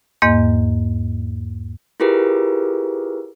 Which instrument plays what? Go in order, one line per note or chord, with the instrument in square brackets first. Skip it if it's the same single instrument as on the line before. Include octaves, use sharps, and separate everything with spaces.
[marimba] E2 G#2 A#3 D#5
[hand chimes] E4 F4 G4 G#4 A#4 B4